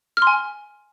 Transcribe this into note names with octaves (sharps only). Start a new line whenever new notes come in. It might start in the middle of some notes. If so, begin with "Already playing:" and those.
G#5 C6 F6